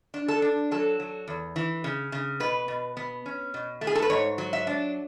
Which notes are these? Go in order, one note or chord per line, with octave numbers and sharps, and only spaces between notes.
D4
A4
D4
F#3 A4
F#3
E2
E3
C#3
C#3
B2 B4
B2
B3
C#4
B2
A3
G#4
A4
B4
G#2 C#5
F#3
E5
D4